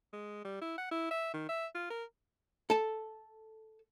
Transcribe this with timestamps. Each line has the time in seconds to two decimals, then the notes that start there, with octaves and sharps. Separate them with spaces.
0.13 G#3
0.45 G3
0.62 E4
0.78 F#5
0.91 E4
1.11 E5
1.34 D#3
1.49 E5
1.75 F4
1.90 A#4
2.70 A4 A5